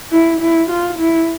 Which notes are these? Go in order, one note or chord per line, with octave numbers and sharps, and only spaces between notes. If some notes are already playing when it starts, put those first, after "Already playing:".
E4
E4
F4
E4